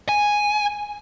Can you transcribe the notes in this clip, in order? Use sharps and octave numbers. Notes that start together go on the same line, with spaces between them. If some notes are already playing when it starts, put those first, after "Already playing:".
G#5